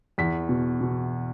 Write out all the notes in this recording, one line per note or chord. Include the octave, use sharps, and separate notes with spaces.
E2 B6
B2
B2